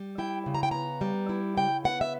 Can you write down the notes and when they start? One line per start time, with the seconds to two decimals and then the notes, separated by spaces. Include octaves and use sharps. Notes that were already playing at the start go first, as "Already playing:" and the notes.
Already playing: G3
0.18 E4 G5
0.46 C#3
0.55 A#5
0.63 G5
0.71 B3 A#5
1.01 G3
1.29 E4
1.57 C#3 G5
1.84 B3 F#5
2.01 E5